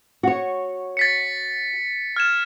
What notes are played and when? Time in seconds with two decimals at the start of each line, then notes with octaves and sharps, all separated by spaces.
0.23 F#4 C#5
0.97 A6 B6 C#7
2.16 F6 G#6 E7